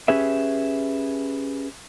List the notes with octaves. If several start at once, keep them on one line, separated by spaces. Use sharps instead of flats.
C#4 G4 G#4 B4 E5